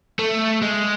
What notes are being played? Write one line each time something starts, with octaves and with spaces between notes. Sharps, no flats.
A3
G#3